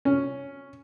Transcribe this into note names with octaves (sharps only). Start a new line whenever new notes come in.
C#4